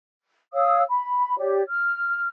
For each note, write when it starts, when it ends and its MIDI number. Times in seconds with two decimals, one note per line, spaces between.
0.53 0.82 73
0.53 0.82 77
0.53 0.82 87
0.53 0.82 88
0.88 1.38 83
1.38 1.62 67
1.38 1.62 73
1.38 1.62 74
1.68 2.28 89